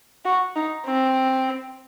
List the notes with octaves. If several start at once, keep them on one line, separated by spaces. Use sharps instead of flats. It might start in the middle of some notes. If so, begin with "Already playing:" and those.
F#4
D#4
C4